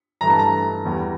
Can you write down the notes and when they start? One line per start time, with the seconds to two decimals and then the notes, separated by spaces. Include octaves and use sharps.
0.21 G2 E3 A3 A#5
0.30 A5
0.39 A#5
0.85 E2 E3 G3